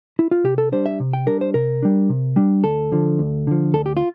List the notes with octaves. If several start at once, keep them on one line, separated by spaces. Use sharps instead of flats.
E4
F4
C3 G4
A4
G3 D4 C5
E5
C3
G5
G3 D4 A#4
C5
C3 A#4
G3 D4
C3
G3 D4
D2 A4
D3 F3
D2
D3 F3
D2 A4
G4
F4